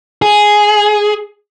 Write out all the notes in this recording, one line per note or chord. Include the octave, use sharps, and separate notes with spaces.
G#4